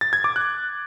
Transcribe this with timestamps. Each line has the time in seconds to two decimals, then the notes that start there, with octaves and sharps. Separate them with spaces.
0.01 A6
0.13 G#6
0.24 D6
0.36 F#6